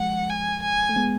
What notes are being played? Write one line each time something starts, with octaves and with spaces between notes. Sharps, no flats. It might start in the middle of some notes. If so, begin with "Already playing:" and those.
Already playing: F3 G#3 F#5
G#5
G#5
A3
G#3 B3